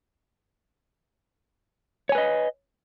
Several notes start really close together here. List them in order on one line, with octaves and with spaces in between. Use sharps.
C#5 G#5 B4 D#5